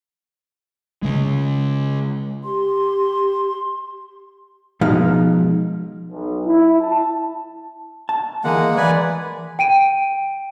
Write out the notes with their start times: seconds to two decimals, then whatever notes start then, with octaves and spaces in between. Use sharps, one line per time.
1.03 C#3 G#3
2.44 G4 C6
4.81 B2 F3 G#3 D#4 F5
6.11 B1
6.47 E4
6.82 A5
8.09 A5
8.44 D#2 E3 G#3 A#3 F#5 G#5
8.77 E3 B4 D5 G#5
9.59 G5 D7 D#7